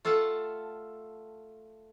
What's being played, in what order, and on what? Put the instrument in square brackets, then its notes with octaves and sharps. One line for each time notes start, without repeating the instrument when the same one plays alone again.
[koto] A3 F4 A4 F#5 A5